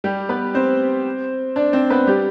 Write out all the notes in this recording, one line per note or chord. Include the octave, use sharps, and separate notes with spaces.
G3 G4
B3 B4
C4 C5
D4 D5
C4 C5
B3 B4
G3 G4